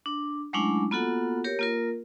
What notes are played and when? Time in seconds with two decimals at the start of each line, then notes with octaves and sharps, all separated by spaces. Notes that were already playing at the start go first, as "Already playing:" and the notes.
0.06 D4
0.53 F#3 G#3 A3 C#4 D4 E4
0.91 A#3 B3 F4 F#4 A4 F#5
1.44 G4 A#4 C#5
1.59 A#3 F4 A#4